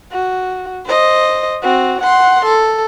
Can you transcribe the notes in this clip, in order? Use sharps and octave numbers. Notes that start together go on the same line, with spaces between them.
F#4
C5 D#5
C4 F#4
F#5 C6
A4